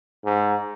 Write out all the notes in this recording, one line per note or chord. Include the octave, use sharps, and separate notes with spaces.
G#2